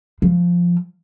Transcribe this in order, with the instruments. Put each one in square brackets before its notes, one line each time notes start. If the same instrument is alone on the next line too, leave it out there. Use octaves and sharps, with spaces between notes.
[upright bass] F3